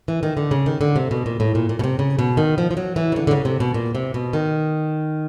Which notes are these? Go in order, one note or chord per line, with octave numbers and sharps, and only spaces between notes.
E3
D#3
D3
C#3
D#3
D3
C3
B2
A#2
A2
A#2
A#2
B2
C3
C#3
B2
D#3
F3
F3
F#3
E3
C#3
D3
D3
C#3
C3
B2
A#2
C3
B2
D#3